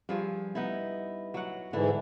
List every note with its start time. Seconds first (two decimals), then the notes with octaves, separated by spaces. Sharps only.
0.09 G2 F3 G#4
0.55 B3 D#4 E4
1.34 F#3 F#5
1.73 G#2 D3 E3 E4